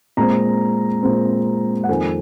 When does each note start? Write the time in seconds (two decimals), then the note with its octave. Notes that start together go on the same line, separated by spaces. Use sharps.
0.17 A#2 G#3 C4 A#5
1.03 A#2 G#3 C4
1.83 F#5
1.89 F2 D#3 A#3 G#5